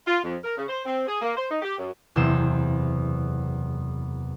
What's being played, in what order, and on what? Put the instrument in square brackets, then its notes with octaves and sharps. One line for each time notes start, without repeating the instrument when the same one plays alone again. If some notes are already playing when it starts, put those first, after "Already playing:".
[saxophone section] F4
F2
A#4
C#3
C5
C4
G#4
A#3
C5
D#4
G4
F#2
[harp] F#1 E2 C3 C5 E7